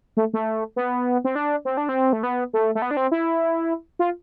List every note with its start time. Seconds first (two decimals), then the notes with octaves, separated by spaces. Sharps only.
0.17 A3
0.33 A3
0.76 B3
1.24 C4
1.35 D4
1.65 C4
1.77 D4
1.89 C4
2.13 A3
2.23 B3
2.53 A3
2.75 A3
2.82 B3
2.91 D4
2.97 C4
3.12 E4
3.99 F4